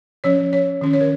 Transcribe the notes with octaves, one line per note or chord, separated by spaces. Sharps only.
F3 C#4 C#5
C#5
D#3 C#4
C#5
A#4